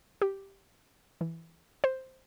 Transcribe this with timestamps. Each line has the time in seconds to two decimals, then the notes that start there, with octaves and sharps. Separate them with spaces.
0.22 G4
1.21 E3
1.84 C5